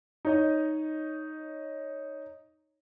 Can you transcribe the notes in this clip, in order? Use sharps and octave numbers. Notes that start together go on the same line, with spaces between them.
D#4 C#5 D#5